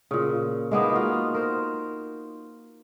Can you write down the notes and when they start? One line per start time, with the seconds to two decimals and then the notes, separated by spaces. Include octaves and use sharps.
0.11 A#2 C#3
0.71 G#3 A#3 B3 D#4
0.93 F4 F#4
1.34 A#4 C5